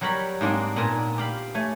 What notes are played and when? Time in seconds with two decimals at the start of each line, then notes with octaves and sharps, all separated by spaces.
0.01 F#3 G3 A#4 C#5 B5
0.41 G#2 A#3 C4 D4 D#5
0.76 A#2 B3 A#4 G#5
1.18 G4 F5 B5
1.55 A3 C#5 G#5